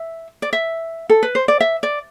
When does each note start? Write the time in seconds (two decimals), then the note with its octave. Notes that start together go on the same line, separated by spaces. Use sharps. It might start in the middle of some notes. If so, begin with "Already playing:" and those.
Already playing: E5
0.42 D5
0.53 E5
1.09 A4
1.23 B4
1.35 C5
1.48 D5
1.60 E5
1.83 D5